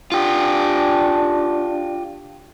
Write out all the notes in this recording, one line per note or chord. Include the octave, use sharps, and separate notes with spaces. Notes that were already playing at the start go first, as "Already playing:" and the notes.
D4 F4 G4